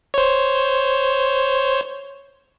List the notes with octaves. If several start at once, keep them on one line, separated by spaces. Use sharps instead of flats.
C5 C#5